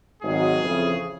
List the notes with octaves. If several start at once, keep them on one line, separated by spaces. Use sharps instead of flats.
G#1 G#2 D#3 F#3 G#4
F2 C#3 E3